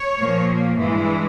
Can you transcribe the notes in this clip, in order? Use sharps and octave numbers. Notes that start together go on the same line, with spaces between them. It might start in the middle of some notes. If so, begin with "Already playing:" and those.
Already playing: C#5
A#2 F3 A#3
G2 E3 G#3